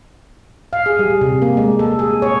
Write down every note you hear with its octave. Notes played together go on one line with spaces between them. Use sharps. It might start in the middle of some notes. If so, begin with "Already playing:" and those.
F5
G#4
G3
C3
A#3
G#3
A4
G#4
C#5